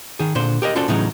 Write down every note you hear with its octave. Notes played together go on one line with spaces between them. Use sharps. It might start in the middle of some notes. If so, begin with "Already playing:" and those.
D#3 G#4
A#2 D3 C5
G4 A#4 C#5 D#5
C#4 F4 F#4 A4 C5 D5
A2 C#3 E3 F#3 C#4 D#4